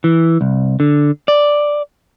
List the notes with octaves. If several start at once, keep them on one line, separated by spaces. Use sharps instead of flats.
E3
C2
D3
D5